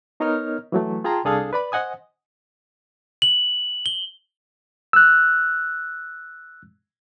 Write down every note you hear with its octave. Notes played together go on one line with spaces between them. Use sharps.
B3 D#4 A#4 C#5 D#5 F6
E3 F#3 A3
F4 G#4 G5 A5 A#5 C6
C2 D4 G#4 A4 F5 D#6
B4 D5 B5
C5 D#5 F#5 G#5 D#6
F#7
G7
E6 F#6